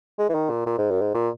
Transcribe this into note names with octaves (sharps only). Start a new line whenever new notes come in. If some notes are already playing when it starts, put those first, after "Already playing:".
G#3
E3
D#3
A#2
A#2
G#2
F#2
G#2
A#2